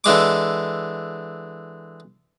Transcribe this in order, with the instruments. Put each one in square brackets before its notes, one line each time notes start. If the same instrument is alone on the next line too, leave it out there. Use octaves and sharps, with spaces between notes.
[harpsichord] D3 E3 G#3 D6